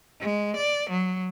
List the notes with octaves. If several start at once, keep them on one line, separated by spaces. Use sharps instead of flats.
G#3
D5
F#3